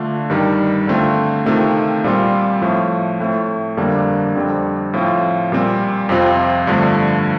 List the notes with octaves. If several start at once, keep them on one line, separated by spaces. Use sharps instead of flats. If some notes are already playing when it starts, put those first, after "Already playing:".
Already playing: D3 A3 D4 F4
G2 D#3 G3
D3 A3 C4 F4
C3 D#3 A3 C4 F4
A#2 G3 C4 F4
A2 F3 A3
A2 A3 C4
F2 D3 G3 A#3 D4
F2 D3 G3 C4
A2 F3 C4 F4
A#2 G3 C4 F4
F2 C3 F3 C4 F4
G2 D3 F3 A3